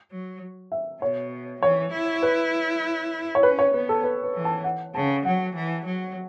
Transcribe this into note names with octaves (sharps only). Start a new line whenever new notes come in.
F#3
E5
B2 C#5
E3 C#5
E4
B4
C#5
C#4 B4
C#5
B3 B4
A4
B4
B4
E3
A5
F#5
C#3 A5
F#3 F#5
E3
F#3